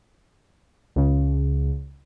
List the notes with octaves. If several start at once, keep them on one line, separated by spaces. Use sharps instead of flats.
C#2 C#3